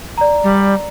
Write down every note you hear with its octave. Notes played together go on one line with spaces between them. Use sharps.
D5 A#5
G3